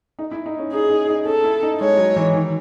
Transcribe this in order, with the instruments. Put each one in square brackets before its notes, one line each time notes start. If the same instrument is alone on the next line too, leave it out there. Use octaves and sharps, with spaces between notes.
[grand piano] D#4
E4
D#4
C#4
[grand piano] D#4 [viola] G#4
[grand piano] D#4
D#4
[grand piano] C#4 [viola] A4
[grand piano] E4
D#4
[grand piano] G#3 [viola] C#5
[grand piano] F#3
E3
D#3